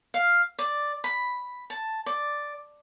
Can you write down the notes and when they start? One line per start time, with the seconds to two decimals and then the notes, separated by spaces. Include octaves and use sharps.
0.14 F5
0.59 D5
1.04 B5
1.70 A5
2.06 D5